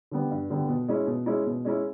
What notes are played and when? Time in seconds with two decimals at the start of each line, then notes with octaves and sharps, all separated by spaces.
0.11 D3 G3 B3
0.31 G2
0.50 D3 G3 B3
0.69 B2
0.88 G#3 C#4 E4
1.07 B2
1.26 G#3 C#4 E4
1.46 B2
1.65 G#3 C#4 E4